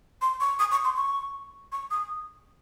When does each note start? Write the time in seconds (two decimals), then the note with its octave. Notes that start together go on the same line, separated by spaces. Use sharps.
0.21 C6
0.40 C#6
0.59 D#6
0.71 C#6
0.84 C6
0.96 C#6
1.72 C#6
1.91 D#6